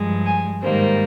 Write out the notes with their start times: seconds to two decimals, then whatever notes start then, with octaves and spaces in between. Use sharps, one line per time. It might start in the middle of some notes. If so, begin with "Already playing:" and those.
Already playing: G2 F3 G#3
0.26 G#5
0.62 G#2 D#3 G3 A#3 C5